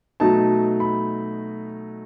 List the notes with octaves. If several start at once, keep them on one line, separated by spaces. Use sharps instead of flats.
B2 F#3 A3 D#4 A5
B5